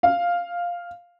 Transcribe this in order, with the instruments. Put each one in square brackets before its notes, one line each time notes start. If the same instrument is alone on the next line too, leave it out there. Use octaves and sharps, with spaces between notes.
[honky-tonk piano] F5